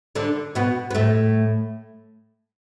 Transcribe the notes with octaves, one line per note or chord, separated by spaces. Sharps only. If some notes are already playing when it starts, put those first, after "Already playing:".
D3 D4
B2 B3
B3
A2 A3